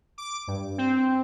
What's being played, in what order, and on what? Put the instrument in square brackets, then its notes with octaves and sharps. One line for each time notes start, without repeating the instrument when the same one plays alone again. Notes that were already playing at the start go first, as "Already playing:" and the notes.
[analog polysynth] D6
G2
C4